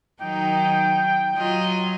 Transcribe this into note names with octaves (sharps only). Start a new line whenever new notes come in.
D#3 F#3 D#4 G5
F#3 F4 D#5